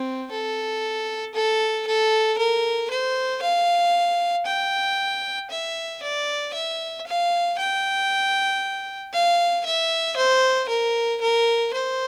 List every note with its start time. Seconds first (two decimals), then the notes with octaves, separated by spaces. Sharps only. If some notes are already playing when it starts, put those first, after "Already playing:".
Already playing: C4
0.31 A4
1.35 A4
1.87 A4
2.38 A#4
2.91 C5
3.42 F5
4.46 G5
5.50 E5
6.02 D5
6.53 E5
7.06 F5
7.58 G5
9.13 F5
9.66 E5
10.17 C5
10.68 A#4
11.21 A#4
11.73 C5